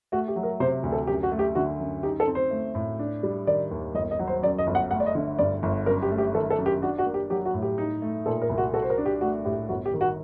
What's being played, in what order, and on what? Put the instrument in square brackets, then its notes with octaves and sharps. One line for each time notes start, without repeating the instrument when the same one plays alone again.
[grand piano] A3 [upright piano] F#4
[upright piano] G4
[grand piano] F#3
[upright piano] A#4
[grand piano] C3 [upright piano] C5
[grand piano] D2
[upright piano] A4
[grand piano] F#2 [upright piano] G4
[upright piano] F#4
[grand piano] A3
[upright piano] G4
[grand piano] D3 [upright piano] F#4
[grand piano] F#2
[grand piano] D#4 [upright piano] G4
[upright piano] A4
[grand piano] C4
[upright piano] C5
[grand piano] A3
A2
D4
G3
[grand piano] D#3 [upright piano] D5
[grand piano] D#2
[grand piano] G1 [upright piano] D#5
[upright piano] D#5
[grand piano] F#3
[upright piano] C5
[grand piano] F#2 [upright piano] D5
[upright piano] D#5
[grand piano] G1
[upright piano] F#5
[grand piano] A3 [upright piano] F#5
[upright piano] D5
D#5
[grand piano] D3
[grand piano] G2 [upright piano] D5
[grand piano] G1
[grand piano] F#2 [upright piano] A#4
[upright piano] G4
[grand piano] A3
[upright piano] G4
[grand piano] D#3 [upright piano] A4
[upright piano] A4
[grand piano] F#2
[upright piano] G4
[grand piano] D4 [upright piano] F#4
[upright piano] F#4
[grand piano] A#3
[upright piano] G4
[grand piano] F#3 [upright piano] G4
[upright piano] F#4
[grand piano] A2
[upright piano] G4
[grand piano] D#4
A3
[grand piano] A#2 [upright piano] A4
[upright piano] A#4
[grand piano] C2
[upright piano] F#4
[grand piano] F#4 [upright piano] A4
[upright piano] C5
A#4
[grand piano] D4
[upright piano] G4
[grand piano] A3 [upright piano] F#4
[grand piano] A2 [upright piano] G4
[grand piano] G1 [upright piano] F#4
[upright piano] G4
[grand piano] D#3
[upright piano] F#4